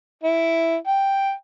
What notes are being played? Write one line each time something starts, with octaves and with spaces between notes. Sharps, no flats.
E4
G5